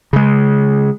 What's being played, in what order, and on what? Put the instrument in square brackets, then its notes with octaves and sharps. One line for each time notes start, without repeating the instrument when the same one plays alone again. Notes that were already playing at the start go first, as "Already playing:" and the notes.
[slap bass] C#3 G#3